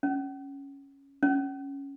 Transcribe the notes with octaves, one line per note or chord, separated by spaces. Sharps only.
C#4
C#4